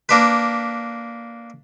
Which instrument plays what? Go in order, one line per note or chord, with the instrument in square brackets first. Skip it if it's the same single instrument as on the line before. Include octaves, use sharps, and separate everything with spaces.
[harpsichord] A#3 D4 B4